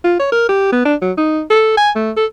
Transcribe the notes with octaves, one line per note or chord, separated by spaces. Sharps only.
F4
C#5
A#4
G4
B3
D4
F#3
D#4
A4
G#5
A3
A4